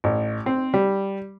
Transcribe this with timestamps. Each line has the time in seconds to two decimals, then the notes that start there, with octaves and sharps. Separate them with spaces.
0.04 A1
0.46 C4
0.74 G3